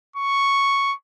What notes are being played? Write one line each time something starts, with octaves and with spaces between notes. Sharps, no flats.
C#6